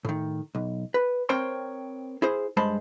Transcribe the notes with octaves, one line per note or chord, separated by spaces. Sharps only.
A2 D#3
B1
B4
C4 A#4 C5 C#5 G5 C6
E4 G#4 C5
G2 G#3 C5 A5 B5